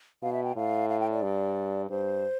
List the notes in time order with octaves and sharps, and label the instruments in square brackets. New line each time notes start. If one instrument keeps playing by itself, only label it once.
[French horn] B2 [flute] F5
[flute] E5
G5
[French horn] A2 [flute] F5
[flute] F5
G5
D5
[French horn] G2
[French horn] G2 [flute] C5